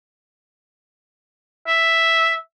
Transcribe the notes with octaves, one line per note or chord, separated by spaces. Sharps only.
E5